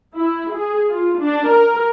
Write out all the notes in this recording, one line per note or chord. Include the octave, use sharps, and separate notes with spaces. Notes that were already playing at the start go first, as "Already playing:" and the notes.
E4
G#4
F4
D4
A#4